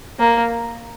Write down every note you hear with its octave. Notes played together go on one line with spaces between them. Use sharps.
A#3